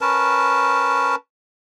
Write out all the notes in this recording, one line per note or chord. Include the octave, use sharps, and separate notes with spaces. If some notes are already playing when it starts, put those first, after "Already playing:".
C#4 A#4 B4 A5